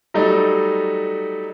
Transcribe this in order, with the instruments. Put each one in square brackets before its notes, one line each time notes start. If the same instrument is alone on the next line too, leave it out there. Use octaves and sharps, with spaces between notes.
[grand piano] F#3 G3 A3 D#4